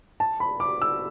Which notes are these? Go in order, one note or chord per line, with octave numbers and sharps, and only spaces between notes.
A5
B5
D6
E6